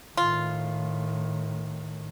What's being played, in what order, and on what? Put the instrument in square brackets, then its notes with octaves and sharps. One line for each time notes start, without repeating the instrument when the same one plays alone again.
[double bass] A2 D#3 [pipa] F4